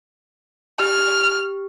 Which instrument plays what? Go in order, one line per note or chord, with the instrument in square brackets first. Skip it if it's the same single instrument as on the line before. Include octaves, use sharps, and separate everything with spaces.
[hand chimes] G4 [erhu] F6